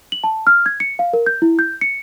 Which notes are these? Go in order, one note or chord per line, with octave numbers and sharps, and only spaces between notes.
F#7
A5
F6
G#6
C#7
F5
A#4
G6
E4
G6
C#7